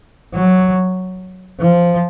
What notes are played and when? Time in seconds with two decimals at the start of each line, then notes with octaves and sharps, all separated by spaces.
0.34 F#3
1.59 F3